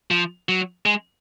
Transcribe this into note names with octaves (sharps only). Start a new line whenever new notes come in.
F3
F#3
G#3